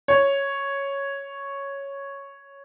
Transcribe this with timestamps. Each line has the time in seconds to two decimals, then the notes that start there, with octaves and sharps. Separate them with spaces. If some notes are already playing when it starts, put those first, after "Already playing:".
0.08 C#5